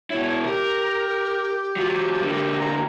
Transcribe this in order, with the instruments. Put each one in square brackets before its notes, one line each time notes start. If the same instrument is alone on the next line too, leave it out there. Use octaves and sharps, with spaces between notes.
[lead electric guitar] B2 E4 [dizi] C#5
[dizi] G4 [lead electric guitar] A#4
[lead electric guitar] F#3 F4
D3 A#3
[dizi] A#5